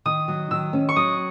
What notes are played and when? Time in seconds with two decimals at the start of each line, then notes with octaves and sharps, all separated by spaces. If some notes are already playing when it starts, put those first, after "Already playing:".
0.05 D#3 D#6
0.28 F#3
0.51 D#3 E6
0.73 C#4
0.89 C#6
0.96 F#3 D#6